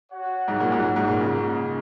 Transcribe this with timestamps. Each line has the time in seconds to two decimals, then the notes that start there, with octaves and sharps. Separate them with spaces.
0.12 F#4 C#5 F#5
0.48 G#2
0.60 A#2
0.72 G#2
0.96 G#2
1.08 A#2
1.20 C#3